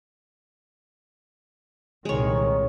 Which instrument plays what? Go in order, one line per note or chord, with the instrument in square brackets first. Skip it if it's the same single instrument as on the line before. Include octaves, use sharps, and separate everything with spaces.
[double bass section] C2 A#2 D#3 [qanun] G#3 C#5